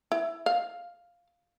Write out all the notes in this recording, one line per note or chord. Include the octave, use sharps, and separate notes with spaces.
E4
F5